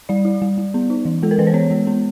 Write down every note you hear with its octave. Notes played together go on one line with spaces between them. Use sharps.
G3 D5
E4
G3
G3
B3
D#4
E3
G#3 A4
A#4
E3 B4
C5
B3 C#5
G#3
B3